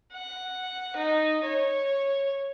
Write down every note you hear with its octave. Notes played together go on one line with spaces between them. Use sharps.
F#5
D#4
C#5